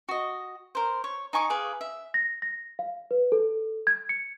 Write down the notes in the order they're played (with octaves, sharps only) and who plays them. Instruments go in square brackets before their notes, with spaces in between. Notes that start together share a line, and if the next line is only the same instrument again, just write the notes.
[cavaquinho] F#4 D#5
A#4 C5
C#5
D#4 G#5 C#6 D6
G#4 B4 F5 D6
E5
[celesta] A#6
A#6
F5
B4
A4
G#6
C#7